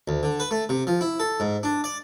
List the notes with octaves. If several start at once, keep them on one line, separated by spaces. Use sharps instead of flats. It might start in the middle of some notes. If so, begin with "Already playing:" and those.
D2
D3
B4
A3
C3
F3
E4
A4
G#2
D4
D5